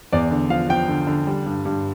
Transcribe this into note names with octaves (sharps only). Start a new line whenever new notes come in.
E2 D5
D3
F3 F5
F3 G5
D3
D3
G3
G2
G2